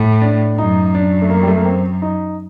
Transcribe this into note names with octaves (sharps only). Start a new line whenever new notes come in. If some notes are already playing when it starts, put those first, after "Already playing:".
Already playing: A2
D4
F#2 D#4
D4
A3
A#3
G3
A3
A#3
C4
D#4